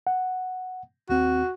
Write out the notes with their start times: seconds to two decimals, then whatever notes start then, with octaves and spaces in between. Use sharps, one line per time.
0.07 F#5
1.09 D#2 C4 F#4